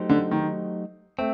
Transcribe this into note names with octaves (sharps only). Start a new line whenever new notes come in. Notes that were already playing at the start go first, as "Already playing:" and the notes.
Already playing: F#3 A3 D#4 G4 C5
D3
D#3
A3 C4